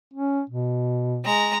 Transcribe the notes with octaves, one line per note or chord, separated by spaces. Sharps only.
C#4
B2
G#3 A#5